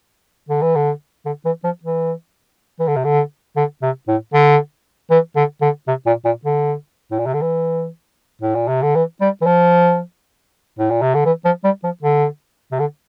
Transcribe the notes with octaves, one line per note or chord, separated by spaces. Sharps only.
D3
E3
D3
D3
E3
F3
E3
E3
D3
C3
D3
D3
C3
A2
D3
E3
D3
D3
C3
A#2
A#2
D3
A2
A#2
C3
D3
E3
A2
A#2
C3
D3
E3
G3
E3
F3
A2
A#2
C3
D3
E3
F3
G3
F3
D3
C3
D3